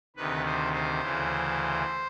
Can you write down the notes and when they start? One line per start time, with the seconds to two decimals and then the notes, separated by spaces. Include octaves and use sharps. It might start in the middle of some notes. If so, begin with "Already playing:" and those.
0.16 D2 C3 D#3 B4
0.45 C5
0.73 C5
1.01 D2 C#3 E3